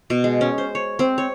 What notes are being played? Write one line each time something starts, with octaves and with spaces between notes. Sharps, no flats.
B2
G#3
C#4
C5
C#5
C4
C#5